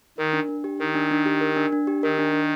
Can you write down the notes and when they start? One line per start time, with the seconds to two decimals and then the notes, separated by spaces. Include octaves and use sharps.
0.18 D#3 A#4
0.33 D4
0.49 D4
0.64 G4
0.80 D#3 A#4
0.95 D4
1.11 D4
1.26 G4
1.41 A#4
1.56 D4
1.72 D4
1.87 G4
2.03 D#3 A#4
2.18 D4
2.33 D4